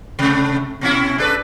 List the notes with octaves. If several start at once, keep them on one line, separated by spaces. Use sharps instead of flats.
C3 A3
B2 C#4 E4
D4 A4 B4